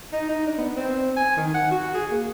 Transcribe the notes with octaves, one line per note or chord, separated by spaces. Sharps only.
D#4
D#4
D4
B3
C4
G#5
D#3
F#5
F#4
G#4
A#3